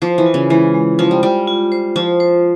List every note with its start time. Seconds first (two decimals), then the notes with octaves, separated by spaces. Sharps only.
0.02 F3 C5
0.18 E3
0.26 F4
0.34 C#3
0.50 E3 G#3
0.74 G#3
0.99 F3 F4
1.11 G3
1.23 G3 F4
1.47 F4
1.72 C5
1.96 F3 F4
2.20 C5